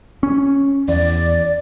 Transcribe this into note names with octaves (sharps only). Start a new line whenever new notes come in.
C#4
E2 D5